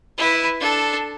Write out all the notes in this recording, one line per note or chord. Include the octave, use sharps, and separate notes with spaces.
E4 B4
D4 A4